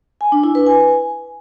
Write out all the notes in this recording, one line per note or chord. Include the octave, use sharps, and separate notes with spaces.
G#5
D4
E4
B4
G#5